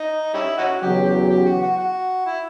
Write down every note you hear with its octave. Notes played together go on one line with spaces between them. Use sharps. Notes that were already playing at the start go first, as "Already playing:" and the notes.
Already playing: D#4
G3 C#4 E4
C#4 D#4 F#4
E2 C#3 F#3 G4
G4
G4
F#4
F#4
F#4
E4